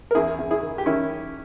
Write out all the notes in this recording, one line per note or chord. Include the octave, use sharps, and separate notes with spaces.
A#4
E2 E4 G#4
E2
E4 G#4
D#3
G4
D#3 C#4 E4